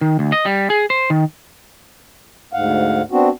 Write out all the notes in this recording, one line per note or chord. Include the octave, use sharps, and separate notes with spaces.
D#3
D2
D#5
G3
G#4
C5
D#3
D2 G#2 F5 F#5
B3 C4 D4 F#4